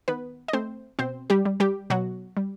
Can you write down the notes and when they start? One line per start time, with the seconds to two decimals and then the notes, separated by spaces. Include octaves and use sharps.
0.08 D#3 B3 B4
0.48 D#5
0.53 A3 C4 C5
0.99 B2 C4 C5
1.30 G3 G4
1.45 G3
1.60 G3 G4
1.90 B2 F#3 F#4
2.37 G3